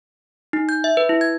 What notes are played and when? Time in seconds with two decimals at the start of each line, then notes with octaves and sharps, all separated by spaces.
0.53 D#4
0.69 G6
0.84 E5
0.97 B4
1.09 E4
1.21 G#6